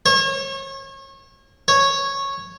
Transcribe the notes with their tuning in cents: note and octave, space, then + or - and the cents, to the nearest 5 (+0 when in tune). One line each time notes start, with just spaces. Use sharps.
C#5 -35
C#5 -10